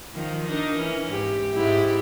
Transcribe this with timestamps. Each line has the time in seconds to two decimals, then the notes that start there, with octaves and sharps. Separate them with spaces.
0.15 D#3 F3
0.46 D4 D#4 A#4
0.77 E3 C#4
1.11 G#2 G4
1.53 G#2 E4 G4